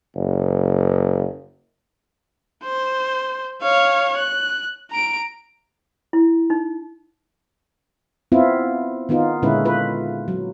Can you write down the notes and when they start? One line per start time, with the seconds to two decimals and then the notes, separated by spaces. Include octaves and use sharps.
0.16 F#1
2.64 C5
3.62 C#5 F5
4.17 F#6
4.91 A#5 D7
6.13 E4
6.50 D#4
8.32 B3 C4 E4 F4
9.09 D#3 B3 D#4 F4
9.42 A#2 D3 G#3 C#4 E4 B4
9.65 F4 B4
10.28 F#3